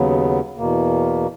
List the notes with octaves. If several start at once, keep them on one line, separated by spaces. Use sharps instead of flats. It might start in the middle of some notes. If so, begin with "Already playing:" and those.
Already playing: D#2 C#3 F#3 B3
E2 B2 A#3